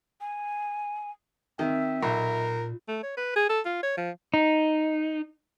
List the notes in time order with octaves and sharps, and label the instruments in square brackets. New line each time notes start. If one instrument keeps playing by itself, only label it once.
[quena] G#5
[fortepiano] D#3 [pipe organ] C4 [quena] E5
[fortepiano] B1 [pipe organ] A#2 [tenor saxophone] A#4
[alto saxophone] A3
C#5
B4
G#4
A4
F4
C#5
F3
[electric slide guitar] D#4